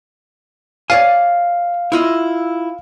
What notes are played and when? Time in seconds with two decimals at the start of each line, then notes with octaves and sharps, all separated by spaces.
0.90 C#5 D5 F5 G#5
1.92 E4 F4 D#5